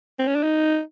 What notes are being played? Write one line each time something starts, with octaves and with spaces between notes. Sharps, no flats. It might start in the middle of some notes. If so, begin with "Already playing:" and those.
C4
C#4
D4
D#4